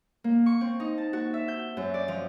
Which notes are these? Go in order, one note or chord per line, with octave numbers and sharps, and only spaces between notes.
A#3
C#6
C4
D#4
A5
F#4
E5
G6
F#2
D5
F3